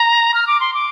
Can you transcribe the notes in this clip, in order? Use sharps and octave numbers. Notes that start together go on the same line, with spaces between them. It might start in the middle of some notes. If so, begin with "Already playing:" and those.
Already playing: A#5
F6
D6
C6
D6